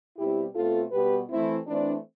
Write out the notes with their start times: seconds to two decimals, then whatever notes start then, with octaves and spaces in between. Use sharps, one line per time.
0.18 B2 G3 C4 E4 G4
0.55 B2 A3 C4 F4 A4
0.92 B2 G3 B3 G4 B4
1.30 E3 A3 C4 E4
1.67 E3 A3 C4 D4